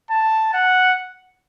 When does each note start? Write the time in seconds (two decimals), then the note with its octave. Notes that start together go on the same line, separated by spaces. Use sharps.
0.11 A5
0.54 F#5